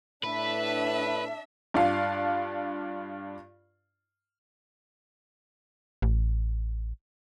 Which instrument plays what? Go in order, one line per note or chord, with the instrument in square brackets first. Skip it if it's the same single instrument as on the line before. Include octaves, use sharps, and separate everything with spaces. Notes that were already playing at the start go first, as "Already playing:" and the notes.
[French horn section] A2 [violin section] D4 E5 [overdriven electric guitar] B4
[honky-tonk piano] G2 D4 F4 F5
[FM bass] A1